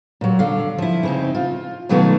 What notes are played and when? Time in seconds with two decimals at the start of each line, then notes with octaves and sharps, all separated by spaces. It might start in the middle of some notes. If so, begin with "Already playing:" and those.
0.21 A#2 F#3
0.39 D3 F5
0.78 F3 E4
1.03 C#3 C4 D#4
1.35 F4
1.89 B2 D#3 F#3 A3 B3 F4